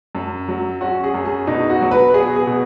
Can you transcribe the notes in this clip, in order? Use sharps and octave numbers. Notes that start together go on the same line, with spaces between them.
F#2
F#3
C#4 F#4
G#4
F#2
G#4
B2 D#4
F#4
F#3
B4
B3 G#4
G#4
B2